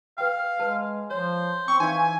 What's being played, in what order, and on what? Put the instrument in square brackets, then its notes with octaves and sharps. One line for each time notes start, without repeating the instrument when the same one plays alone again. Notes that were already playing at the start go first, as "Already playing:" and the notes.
[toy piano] B4 G5 [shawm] F5
[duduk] G#3 [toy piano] B4 A5
[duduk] F3 [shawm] C5 [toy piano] C#5
[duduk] C4 [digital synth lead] C#6
[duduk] E3 [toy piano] D#4 F5 [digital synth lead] G#5